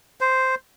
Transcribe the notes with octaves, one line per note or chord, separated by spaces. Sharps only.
C5